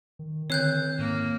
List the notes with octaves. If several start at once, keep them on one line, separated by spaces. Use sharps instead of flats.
D#3
D3 D#3 C4 C#5 F#6 G6 C7
G#2 A#3